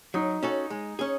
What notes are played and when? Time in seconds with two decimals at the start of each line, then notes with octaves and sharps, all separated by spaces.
0.14 F#3 D#4
0.43 C#4 F#4 A4
0.70 G#3
0.99 C#4 G#4